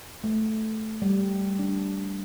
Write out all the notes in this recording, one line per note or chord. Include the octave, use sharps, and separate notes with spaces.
A3
G3
D4